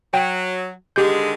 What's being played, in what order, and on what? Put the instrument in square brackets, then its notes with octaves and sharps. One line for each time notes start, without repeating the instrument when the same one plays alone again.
[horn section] F#3 [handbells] G5
[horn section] D3 D#3 G#3 [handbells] G4 G6